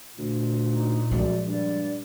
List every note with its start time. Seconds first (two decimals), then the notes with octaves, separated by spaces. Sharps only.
0.18 D2 A#2
0.70 D#4
1.11 F#2 F3 G#3 D5
1.47 G2 D5